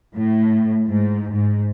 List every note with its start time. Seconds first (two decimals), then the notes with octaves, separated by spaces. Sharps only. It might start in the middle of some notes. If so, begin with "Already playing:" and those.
0.16 A2
0.88 G#2
1.33 G#2